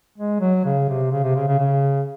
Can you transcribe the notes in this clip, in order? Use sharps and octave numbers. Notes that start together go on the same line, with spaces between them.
G#3
F#3
C#3
C3
C#3
C3
C#3
C#3
C#3